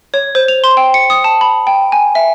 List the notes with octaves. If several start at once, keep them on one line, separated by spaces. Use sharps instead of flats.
C#5
C5
F7
C6
G5
C#7
D#6
A5
B5
G5
G#5
E5